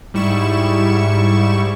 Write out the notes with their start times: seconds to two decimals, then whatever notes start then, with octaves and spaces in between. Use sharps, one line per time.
0.14 G#2 G3 E4 C#6 E7